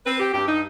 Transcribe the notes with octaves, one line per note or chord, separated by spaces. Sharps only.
C4 B4
G4
G2 G4
D#4